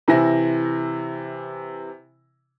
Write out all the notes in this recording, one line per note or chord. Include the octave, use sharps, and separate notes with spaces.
C3 E3 E4 G#5 A#6